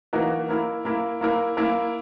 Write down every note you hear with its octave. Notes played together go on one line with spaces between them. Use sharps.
E3 A#3 D#4 F#4 A#4
A#3 E4 A#4
A#3 E4 A#4
A#3 E4 A#4
A#3 E4 A#4